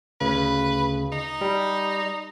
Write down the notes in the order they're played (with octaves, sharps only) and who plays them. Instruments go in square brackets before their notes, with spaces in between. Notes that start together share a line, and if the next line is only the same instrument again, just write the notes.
[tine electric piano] D2 C#3 [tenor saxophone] B4
[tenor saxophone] D#4
[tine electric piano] G3